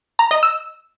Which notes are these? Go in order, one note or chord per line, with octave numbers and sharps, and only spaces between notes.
A#5
D#5
E6